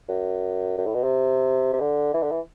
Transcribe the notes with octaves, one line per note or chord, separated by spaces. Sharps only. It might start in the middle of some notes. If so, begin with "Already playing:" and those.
F#2
F#2
A2
B2
C3
C3
D3
E3
D3
E3